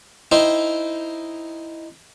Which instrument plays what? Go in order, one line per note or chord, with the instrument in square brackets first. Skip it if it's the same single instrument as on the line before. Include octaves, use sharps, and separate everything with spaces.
[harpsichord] D#4 E4 C5 D#5 G5